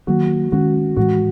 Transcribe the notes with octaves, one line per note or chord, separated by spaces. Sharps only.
D#3 F#3 A#3 F#4
D#3 G#3 C#4 F#4
A2 E3 G#3 F#4